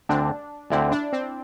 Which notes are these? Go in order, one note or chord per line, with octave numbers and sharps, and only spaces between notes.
D2 D3 C4 D4
D2 D3 C4 E4
D4
C4